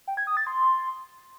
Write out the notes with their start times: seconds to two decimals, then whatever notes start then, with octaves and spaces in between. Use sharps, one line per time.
0.07 G5
0.17 G#6
0.27 D#6
0.37 A6
0.47 C6